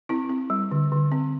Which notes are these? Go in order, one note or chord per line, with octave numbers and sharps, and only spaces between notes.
C4 E4
C4
G3
D3
D3
C4